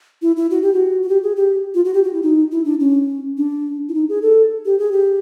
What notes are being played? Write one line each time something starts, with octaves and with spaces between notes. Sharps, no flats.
E4
E4
F#4
G4
F#4
F#4
G4
G#4
G4
F4
F#4
G4
F#4
E4
D#4
E4
D4
C#4
D4
E4
D#4
G#4
A4
G4
G#4
G4